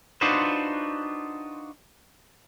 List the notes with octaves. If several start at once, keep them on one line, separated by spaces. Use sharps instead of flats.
D4 D#4 F4 F#4 B4 C5